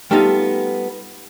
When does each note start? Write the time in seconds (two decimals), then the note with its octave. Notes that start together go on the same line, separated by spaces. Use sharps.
0.11 G3 A3 B3 D#4 F4